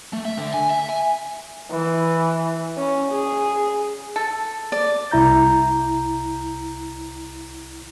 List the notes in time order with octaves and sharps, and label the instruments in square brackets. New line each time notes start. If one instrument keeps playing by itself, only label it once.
[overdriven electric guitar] A3
E5
D3
G#5
E5
G#5
[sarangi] E3
C#4
G#4
[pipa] A4
[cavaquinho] D5
[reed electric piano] C2 E4 A#5 G6